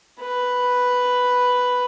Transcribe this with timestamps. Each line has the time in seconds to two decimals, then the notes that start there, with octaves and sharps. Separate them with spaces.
0.20 B4